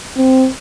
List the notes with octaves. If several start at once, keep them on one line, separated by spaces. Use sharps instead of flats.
C4